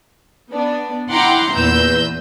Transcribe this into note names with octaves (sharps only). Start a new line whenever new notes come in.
B3 D4
E4 F#5 G5 A#5 C6 D6
E2 A#2 B4 E6 G6